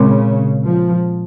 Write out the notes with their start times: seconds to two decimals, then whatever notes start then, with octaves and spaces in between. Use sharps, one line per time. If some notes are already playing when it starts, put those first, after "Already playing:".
Already playing: A#2 C#3 G#3 C4
0.64 F3